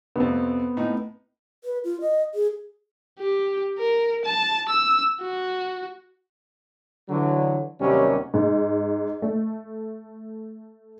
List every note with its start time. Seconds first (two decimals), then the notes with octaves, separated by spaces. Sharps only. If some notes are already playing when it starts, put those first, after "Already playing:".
0.16 F2 C3 B3 C4
0.77 A2 D#4
1.64 B4
1.84 F4
2.01 D#5
2.34 G#4
3.19 G4
3.78 A#4
4.25 A5
4.69 E6
5.21 F#4
7.09 D3 E3 F#3
7.80 D#2 C3 D#3 F#3 G3 C#4
8.34 G#2
9.22 A3